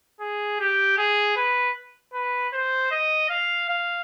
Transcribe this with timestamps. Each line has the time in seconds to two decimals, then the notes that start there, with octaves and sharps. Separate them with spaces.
0.21 G#4
0.60 G4
0.98 G#4
1.36 B4
2.13 B4
2.53 C5
2.91 D#5
3.30 F5
3.69 F5